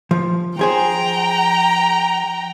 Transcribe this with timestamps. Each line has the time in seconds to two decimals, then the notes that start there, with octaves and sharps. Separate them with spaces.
0.11 F3
0.59 F3 G#4 C5 G5 A#5